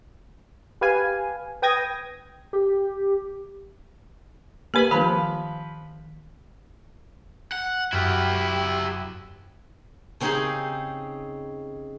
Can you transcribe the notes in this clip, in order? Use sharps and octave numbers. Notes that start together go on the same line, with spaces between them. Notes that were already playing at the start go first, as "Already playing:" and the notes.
G4 B4 F5 G#5
B4 G5 D#6 G#6 A#6
G4
A#3 G4 B4 G#5 B5
D#3 F3 B4
F#5
F#2 E4 G4 F#5 F6
C#3 C4 C#4 D#4 G4 G#4